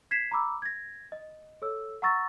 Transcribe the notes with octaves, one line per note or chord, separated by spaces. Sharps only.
G#6 B6 C7 E7
A#5 B5 D6 E6
G#6 A#6
D#5
A4 C#5 E6
F#5 A#5 C#6 E6 A6 A#6